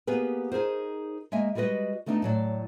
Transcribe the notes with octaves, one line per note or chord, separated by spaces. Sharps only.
A#3 B3 G4 G#4 A#4 B4
D#4 G#4 A#4 C5
G#3 A#3 E5 G#5
G3 G#3 F#4 B4 D#5
D#3 A3 B3 C4 D4 D#4
A2 F#3 D5